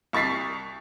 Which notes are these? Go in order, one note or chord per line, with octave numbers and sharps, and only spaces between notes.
C2 C#6 A6 B6 C7